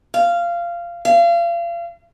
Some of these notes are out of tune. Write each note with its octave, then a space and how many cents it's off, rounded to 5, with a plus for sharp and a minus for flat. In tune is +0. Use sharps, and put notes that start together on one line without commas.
F5 -15
F5 -35